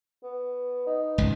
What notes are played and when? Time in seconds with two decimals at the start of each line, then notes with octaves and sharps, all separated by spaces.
0.23 B3
0.87 D#4
1.18 G#1 C#2 D#3